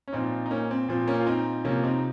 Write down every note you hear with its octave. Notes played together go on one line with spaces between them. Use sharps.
C#4
A#2 F3 C4 D#4
D#4
A#3 C#4
C4
A#2 F3 C4
A#3 C#4
F4
C4 D#4
C3 F3 A#3 C#4
C4 D#4